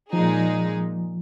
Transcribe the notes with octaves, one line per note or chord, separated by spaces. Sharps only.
A#2 F3 G#3 D#4 G#4